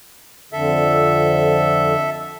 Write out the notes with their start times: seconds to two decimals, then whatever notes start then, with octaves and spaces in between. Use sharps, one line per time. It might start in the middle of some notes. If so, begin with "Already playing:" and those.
0.53 F2 D3 A4 E5